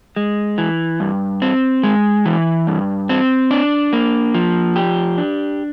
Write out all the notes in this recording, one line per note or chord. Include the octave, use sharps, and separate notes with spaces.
G#3
E3
G2
C4
G#3
E3
G2
C4
D4
A#3
F3
G4
D4